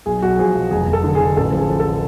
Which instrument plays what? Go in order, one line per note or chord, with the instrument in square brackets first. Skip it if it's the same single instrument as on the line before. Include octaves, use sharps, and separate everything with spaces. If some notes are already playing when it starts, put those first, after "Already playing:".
[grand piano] B1 G#4
B1 F#4
F3 G#4
B1
F1 G#4
F1
A4
D3
G#4
D3
A1 A4
F3
G#4
F3
A4